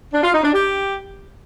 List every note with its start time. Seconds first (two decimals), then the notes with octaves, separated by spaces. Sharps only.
0.13 D4
0.23 F4
0.33 D#4
0.43 D4
0.53 G4